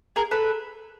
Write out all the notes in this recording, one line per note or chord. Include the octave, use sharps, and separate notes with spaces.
G#4 A#4
A4 B4